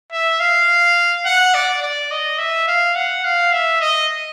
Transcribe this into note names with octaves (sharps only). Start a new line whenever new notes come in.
E5
F5
F#5
D5
D5
D#5
E5
F5
F#5
F5
E5
D#5